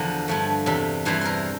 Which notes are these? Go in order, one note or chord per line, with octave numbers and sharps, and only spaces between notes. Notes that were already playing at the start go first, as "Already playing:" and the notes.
Already playing: E2 D3 F3 A#4 C5
G2 F3 A3
E2 C3 G3
G2 E3 G3 C5
A#4 C5